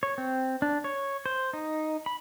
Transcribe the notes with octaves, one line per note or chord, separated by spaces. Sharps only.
C#5
C4
D4
C#5
C5
D#4
B5